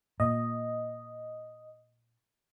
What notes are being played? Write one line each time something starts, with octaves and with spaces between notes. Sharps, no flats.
A#2 D#5